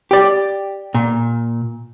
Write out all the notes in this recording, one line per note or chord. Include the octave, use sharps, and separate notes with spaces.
G4 D5
A#2